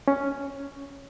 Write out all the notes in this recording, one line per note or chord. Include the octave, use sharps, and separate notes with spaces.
C#4